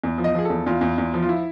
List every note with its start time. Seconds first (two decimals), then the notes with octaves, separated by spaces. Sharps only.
0.04 E2
0.18 F3
0.24 D#5
0.35 F3 G#4
0.45 E2 A4
0.66 E2 F4
0.81 E2
0.98 E2
1.14 F3
1.22 F4
1.29 E4